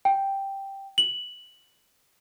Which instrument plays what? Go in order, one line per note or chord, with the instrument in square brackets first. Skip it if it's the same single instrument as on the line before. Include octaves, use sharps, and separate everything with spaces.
[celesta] G5
F#7